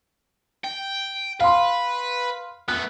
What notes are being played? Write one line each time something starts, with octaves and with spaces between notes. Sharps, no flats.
G5
B4 F5 C6
A3 B3 F#6